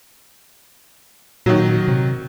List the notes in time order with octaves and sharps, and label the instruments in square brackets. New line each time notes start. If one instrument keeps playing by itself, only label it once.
[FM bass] A#2 [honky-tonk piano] D#3 F#3
[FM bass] C3